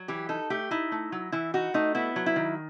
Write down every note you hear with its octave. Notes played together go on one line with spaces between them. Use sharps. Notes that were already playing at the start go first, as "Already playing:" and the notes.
Already playing: F#3
E3 G4
D#4 A4
A3 G4
D#4 E4
A3
F#3
E3 E4
D#4 F#4
A3 D#4
B3 E4
F#3
E4
D#3